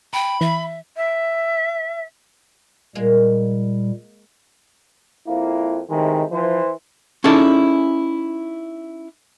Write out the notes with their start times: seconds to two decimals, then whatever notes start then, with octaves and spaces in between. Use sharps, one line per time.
0.13 G5 B5
0.41 E3 E5
0.96 E5
2.95 A#2 G3 G#3 A#3
5.27 F2 A#3 E4
5.90 A2 C3 D#3 G#3
6.31 E3 F3 C5
7.24 C#4 D#4 E4 G#4 A4 D5